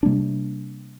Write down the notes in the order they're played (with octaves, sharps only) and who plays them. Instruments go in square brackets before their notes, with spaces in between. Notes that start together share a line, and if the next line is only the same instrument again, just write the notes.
[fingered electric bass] C3 G3 A#3 D4